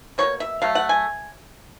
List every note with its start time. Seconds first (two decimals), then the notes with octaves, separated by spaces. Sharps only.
0.18 B2 G3 A#3 C#5
0.40 E5
0.62 F#3 A3 F5
0.75 F#5
0.89 G#5